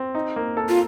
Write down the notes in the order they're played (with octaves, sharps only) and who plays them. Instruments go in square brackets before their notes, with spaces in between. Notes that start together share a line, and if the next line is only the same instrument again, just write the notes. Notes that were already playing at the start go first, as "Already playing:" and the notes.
Already playing: [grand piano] C4
D#4
A#3
A4
[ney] F4